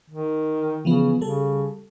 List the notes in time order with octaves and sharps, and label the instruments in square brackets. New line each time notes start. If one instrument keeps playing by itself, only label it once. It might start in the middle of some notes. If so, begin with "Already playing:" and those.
[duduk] D#3
[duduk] C#3 [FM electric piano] E3 F3 B3
[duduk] C#3 [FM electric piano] G3 A4